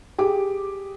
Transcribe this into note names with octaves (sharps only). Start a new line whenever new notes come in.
G4 G#4 D6